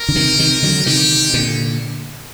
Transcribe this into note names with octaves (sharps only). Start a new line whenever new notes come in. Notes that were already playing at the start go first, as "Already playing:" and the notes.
Already playing: A#4
D3
C3 D#3
C3 D#3
D3 F#3
C3 D#3 G4
A#2 D3